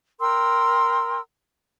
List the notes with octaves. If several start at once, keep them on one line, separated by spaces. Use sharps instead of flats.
A#4 G5 C6 E6